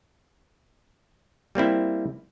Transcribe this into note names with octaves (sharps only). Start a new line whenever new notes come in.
G3 A#3 C4 E4